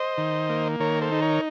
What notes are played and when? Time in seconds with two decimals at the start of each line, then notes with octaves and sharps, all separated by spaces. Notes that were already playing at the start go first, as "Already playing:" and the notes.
Already playing: C5 D#5
0.17 D#3
0.49 A#3
0.80 D#3 A#4 C#5
1.01 A4 C5
1.12 D#4
1.22 A#4 C#5